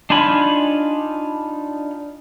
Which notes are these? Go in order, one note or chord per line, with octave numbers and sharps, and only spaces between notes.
D4 D#4 F4 G#5 B5